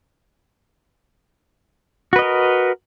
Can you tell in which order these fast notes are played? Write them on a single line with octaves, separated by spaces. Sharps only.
F#4 B4 D#5 A#4